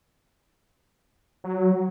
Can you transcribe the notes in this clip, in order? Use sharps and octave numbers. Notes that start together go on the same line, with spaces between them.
F#3